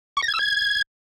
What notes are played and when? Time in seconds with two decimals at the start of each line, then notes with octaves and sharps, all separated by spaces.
0.17 C#6
0.22 A#6
0.28 G#6
0.34 E6
0.39 G#6